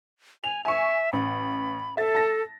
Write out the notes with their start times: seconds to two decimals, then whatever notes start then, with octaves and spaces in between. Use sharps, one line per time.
0.44 G#5 F7
0.65 E5 G#5 C#6
1.13 A1 B5
1.97 A4 E5 A6
2.15 A5 A#6